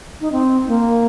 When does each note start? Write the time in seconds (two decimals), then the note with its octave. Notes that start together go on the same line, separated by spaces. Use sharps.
0.21 D#4
0.32 C4
0.68 A#3